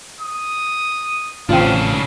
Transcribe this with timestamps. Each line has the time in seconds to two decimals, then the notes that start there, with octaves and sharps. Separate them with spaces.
0.21 D#6
1.49 A1 C#3 C4 D4 F4 F5